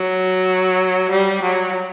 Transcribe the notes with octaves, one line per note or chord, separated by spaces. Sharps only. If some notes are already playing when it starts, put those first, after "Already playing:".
Already playing: F#3
G3
F#3